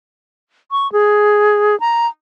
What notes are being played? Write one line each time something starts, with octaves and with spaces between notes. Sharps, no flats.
C#6
G#4
A#5